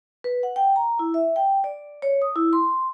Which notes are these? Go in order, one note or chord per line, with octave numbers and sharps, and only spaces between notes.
B4
F#5
G5
A#5
E4
E5
G5
D5
C#5
D#6
E4
C6